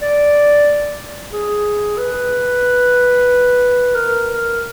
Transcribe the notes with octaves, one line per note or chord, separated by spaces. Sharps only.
D5
G#4
B4
A#4